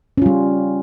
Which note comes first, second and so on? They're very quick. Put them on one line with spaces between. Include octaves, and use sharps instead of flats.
C#4 F4 G3